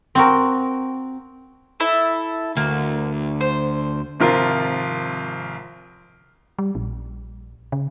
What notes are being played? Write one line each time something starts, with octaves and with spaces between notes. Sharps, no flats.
C4 F#4 A#4
E4 A4
D2 A#3
C5
G#1 C3 F3 F4 A#4 C7
G3
A#1
C#3